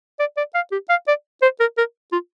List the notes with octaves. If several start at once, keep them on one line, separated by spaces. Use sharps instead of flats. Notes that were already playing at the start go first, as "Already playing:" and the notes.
D5
D5
F5
G4
F5
D5
C5
A#4
A#4
F4